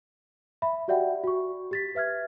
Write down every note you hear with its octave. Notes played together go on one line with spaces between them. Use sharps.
E5 B5
F#4 G4 D5 E5 F#5 G5
F#4 C#6
G4 A6 B6
B4 E5 F6 G#6